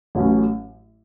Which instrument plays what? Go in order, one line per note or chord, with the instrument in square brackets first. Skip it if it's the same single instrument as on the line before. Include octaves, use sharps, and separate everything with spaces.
[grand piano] A1 A2 F#3 A3 C#4